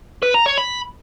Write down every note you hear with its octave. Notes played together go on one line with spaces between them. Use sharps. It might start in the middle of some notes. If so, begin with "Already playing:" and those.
B4
A#5
C#5
B5